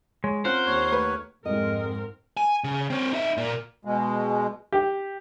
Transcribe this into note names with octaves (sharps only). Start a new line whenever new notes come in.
G#3 C#5
C4 C#4 F4 A#4 C5 F#5
D#2 C#5
A3 B4
F2 G#2 G#3 C4 A#4 D#5
G#5
C#3
C4 C#5
D#4 E5
A#2 A#3
B2 G#3
G4